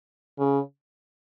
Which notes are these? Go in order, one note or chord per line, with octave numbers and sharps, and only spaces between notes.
C#3